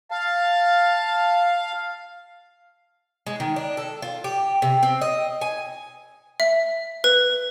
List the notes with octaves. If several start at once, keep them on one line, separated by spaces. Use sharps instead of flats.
F5 A5
G#3
D#3
D4
A4
F4
G4
C3
C4
D#5
G#5
E5
B4